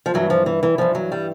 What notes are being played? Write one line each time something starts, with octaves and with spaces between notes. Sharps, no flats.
F3
G2 E3 F#3
F3
E3
E3
G2 E3 F3
F#3
G3